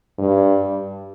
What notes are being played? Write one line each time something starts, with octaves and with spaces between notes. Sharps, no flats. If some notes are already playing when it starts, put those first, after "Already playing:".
G2